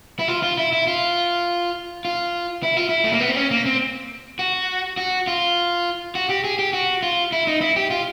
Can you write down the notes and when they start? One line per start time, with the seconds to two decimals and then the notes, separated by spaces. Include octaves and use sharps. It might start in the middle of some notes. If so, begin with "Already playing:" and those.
0.19 E4
0.28 F4
0.43 F4
0.58 E4
0.73 E4
0.87 F4
2.05 F4
2.63 E4
2.77 F4
2.89 E4
3.04 A3
3.12 A#3
3.20 B3
3.29 C4
3.36 C#4
3.51 A#3
3.66 C4
4.39 F#4
4.97 F#4
5.27 F4
6.15 F#4
6.29 G4
6.44 G#4
6.59 G4
6.73 F#4
7.03 F4
7.32 E4
7.47 D#4
7.61 E4
7.76 G4
7.91 F4